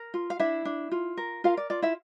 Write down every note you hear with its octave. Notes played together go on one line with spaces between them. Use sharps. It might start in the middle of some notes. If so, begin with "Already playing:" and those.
Already playing: A#4
F4
F5
D4 E4 E5
D4
F4
A#4
F4 A#4 F5
D5
F4 D5
E4 E5